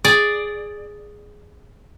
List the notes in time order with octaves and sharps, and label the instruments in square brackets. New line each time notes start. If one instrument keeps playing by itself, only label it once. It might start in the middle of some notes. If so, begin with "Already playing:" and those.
[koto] G#4 D5